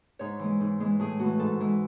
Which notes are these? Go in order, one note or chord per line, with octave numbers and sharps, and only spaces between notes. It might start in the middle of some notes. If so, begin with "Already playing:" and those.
G#2 C#5
E3 G#3
G#2
E3 G#3
A2 G#4
E3 A3 F#4
G#2 A4
E3 G#3